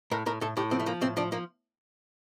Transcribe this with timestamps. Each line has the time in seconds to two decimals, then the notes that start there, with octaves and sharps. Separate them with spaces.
0.11 A2 A#4
0.26 A2 A#4
0.41 A2 A4
0.57 A2 G4
0.71 F3 C4
0.80 A3
0.86 F3 A#3
1.01 A2 C4
1.17 F3 D4
1.32 F3 A#3